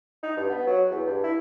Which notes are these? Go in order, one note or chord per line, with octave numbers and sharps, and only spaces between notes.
D#4
G2
B3
F#3
E2
G2
E4